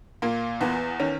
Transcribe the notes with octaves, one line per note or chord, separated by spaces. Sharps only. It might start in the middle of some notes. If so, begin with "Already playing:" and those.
A#2 A#3
E2 B3
D#3 C#4